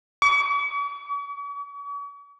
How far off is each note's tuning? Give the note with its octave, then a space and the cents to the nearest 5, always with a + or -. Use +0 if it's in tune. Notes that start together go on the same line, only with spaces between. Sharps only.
C#6 +45